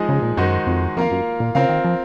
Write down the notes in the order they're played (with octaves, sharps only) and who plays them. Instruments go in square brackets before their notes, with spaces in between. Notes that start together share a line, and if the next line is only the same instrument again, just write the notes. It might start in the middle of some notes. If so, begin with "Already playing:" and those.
Already playing: [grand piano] F3 G#3 D#4 G#4 D#5
[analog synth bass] C#3
A#2
[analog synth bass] F#2 [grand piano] D#3 G#3 D#4 F#4 C5
[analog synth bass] F2
[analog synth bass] F2 [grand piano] A#3 F4 A#4 F5
[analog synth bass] F#2
A#2
[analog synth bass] C#3 [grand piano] C4 F4 A#4 F5
[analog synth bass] D#3
F3